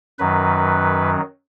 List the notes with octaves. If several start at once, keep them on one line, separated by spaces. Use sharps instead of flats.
F#2 D#3 F#3 B4